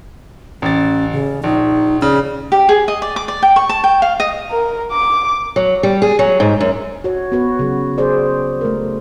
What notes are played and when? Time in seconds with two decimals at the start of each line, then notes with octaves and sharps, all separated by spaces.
0.62 A1 C#4 A6
1.12 C#3
1.44 A#1 D#4
2.02 C#3 D5
2.52 G4
2.69 G#4
2.88 D#5
3.02 D5
3.16 D6
3.28 D5
3.43 G5
3.56 C#6
3.69 A5
3.84 G5
4.02 F5
4.20 D#5
4.51 A#4
4.92 D6
5.56 F#3
5.83 G3
6.02 G#4
6.19 F#3
6.40 G#2
6.60 F#2
7.04 F#4 C#5
7.32 B3 F#4 B4
7.59 C#3 F#3
7.98 G#4 C5 D5
8.61 A3 A#4